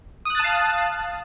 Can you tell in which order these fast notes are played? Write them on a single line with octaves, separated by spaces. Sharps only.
D#6 F#6 A6 A5 F5